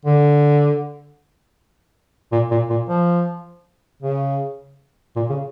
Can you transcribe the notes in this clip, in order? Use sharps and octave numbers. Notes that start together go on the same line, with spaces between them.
D3
A#2
A#2
A#2
F3
C#3
A#2
C#3